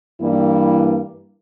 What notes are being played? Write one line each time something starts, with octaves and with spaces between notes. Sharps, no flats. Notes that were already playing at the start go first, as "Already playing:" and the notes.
G2 E3 G3 A#3 E4